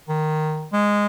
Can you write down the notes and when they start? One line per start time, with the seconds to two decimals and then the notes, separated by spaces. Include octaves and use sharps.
0.08 D#3
0.72 G#3